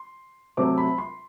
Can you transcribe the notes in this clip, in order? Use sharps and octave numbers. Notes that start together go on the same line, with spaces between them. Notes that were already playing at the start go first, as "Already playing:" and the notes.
Already playing: C6
C3 F#3 A3 C4 D6
B5
C6